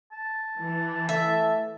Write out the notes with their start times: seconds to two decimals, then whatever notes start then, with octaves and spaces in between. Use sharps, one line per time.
0.13 A5
0.59 E3
1.09 A3 E5